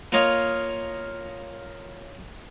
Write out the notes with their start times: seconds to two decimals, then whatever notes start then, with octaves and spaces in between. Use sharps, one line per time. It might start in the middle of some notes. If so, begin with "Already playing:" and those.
0.12 A#3 F4 C#5 D#5 F5